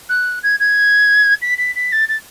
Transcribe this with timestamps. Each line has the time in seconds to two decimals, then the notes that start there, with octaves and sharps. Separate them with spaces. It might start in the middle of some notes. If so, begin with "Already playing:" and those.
0.09 F#6
0.43 G#6
0.60 G#6
1.42 B6
1.58 B6
1.76 B6
1.92 A6
2.09 A6